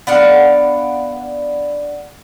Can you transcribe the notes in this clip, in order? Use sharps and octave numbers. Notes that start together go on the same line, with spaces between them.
B3 D4 F5 F#5